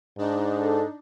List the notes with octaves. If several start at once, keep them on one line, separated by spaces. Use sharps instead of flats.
G#2 D4 D#4
A4